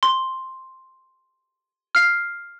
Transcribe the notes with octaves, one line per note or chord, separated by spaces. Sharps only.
C6
F6 C7